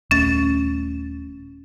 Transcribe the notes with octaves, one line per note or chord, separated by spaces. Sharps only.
D#1 A3 C#4 A6